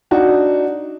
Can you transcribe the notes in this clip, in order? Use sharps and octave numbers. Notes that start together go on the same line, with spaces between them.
D4 D#4 F#4